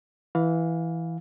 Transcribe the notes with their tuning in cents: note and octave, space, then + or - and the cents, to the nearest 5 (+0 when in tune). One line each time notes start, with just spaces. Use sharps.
E3 +0 F5 +20